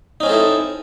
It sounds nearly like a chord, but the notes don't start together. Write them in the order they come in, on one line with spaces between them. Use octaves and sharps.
D#4 C#4 C4 A4 E4